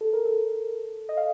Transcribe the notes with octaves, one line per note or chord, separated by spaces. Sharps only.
A4
A#4
A4
D#5
F5